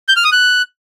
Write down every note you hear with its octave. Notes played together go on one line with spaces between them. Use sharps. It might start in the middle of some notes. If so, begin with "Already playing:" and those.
G6
F6
D#6
F#6